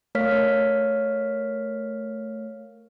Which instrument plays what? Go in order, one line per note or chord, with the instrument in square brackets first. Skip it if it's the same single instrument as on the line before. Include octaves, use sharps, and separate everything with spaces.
[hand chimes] A3 A#4 C#5 F5 F6 B6